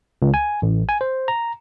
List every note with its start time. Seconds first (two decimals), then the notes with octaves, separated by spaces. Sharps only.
0.22 C#2
0.34 G#5
0.62 A1
0.89 G#5
1.01 C5
1.28 A#5